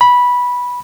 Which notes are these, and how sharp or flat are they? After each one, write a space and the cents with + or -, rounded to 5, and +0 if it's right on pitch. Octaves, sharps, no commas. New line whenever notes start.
B5 -10